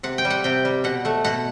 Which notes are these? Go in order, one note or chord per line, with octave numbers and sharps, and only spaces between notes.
C3 F#5
G5
G3
F#5
C3 G5
G3
B2 F#5
A3 F#5
B2 F#5